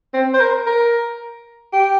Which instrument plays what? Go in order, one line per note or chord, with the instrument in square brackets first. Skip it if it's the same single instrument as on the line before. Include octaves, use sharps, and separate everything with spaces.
[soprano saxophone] C4
C5
A#4
A#4
G4